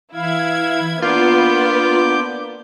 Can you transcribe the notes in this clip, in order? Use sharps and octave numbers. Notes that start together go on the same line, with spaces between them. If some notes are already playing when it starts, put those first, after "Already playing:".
E3 E4 F5 G#6
A#3 B3 D4 F4 D6 G6